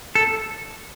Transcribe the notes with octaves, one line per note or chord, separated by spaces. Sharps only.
A4